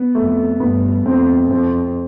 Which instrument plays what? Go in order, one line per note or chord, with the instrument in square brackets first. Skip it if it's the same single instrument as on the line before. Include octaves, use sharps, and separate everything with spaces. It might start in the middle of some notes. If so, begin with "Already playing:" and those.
Already playing: [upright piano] B3
[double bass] F2 [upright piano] A3
[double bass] G2 [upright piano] B3
[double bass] F2 [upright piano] C4
[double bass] F2 [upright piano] C4